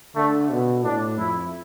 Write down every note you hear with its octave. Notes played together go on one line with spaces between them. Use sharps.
D3 A3
B2
A2 D4
F2 E4